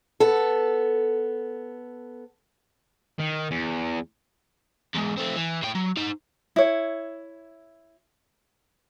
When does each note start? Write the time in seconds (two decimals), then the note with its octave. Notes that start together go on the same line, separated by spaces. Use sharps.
0.20 B3 A4
3.19 D#3
3.51 E2
4.94 E2 G#2
5.17 A3 C4
5.36 E3
5.62 A2 G5
5.75 F#3
5.97 D#4 C5
6.56 E4 C#5